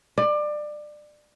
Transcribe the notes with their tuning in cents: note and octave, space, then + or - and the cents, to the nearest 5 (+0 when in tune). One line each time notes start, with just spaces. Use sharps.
D5 +25